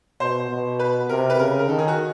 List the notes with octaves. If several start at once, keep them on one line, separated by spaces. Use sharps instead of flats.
B2 C5
B2
B4
C3 A#4
B4
C#3 A#4
A#4
D#3 A4
G#4
F#4